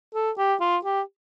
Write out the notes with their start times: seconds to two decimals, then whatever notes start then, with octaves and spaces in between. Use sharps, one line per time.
0.14 A4
0.38 G4
0.60 F4
0.85 G4